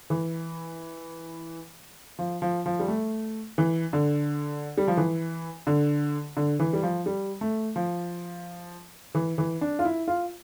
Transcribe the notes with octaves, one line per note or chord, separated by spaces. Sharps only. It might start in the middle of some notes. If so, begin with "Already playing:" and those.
E3
F3
F3
F3
G3
A3
E3
D3
G3
F3
E3
D3
D3
E3
G3
F3
G3
A3
F3
E3
E3
D4
F4
E4
F4